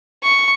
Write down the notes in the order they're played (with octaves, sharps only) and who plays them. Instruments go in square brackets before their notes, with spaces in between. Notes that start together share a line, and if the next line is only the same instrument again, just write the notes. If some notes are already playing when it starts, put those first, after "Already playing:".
[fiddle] C#6